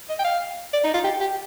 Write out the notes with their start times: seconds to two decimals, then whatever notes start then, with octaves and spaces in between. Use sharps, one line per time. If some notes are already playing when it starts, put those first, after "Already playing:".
0.09 D#5
0.19 G5
0.24 F5
0.73 D5
0.84 D#4
0.94 F4
1.04 G4
1.21 G4